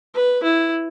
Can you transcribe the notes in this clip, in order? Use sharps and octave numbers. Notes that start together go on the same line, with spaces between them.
B4
E4